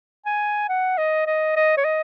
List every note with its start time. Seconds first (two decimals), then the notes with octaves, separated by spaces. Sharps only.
0.26 G#5
0.69 F#5
0.98 D#5
1.27 D#5
1.56 D#5
1.77 C#5
1.85 D#5